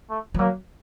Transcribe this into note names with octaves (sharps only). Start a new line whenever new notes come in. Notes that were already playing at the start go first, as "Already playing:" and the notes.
A3
F3
F#3 A#3